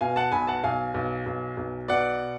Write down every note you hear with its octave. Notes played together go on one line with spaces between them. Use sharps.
B2 F5 G#5
F#5 A5
B1 G#5 B5
F#5 A5
B1 F5 G#5
B1
B1
B1
B2 D5 F#5